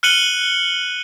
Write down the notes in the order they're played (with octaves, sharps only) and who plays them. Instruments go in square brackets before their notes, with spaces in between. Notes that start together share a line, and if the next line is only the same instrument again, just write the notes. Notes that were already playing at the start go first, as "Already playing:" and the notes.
[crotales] F6 F#6 C#7 D#7 F#7 G7